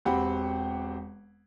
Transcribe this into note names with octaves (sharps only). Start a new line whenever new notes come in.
E1 C4 G4 F#5 B5